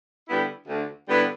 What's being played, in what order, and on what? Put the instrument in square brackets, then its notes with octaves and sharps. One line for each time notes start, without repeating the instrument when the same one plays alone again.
[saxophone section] D3 G3 B3 E4
D2
D3 G3 B3 E4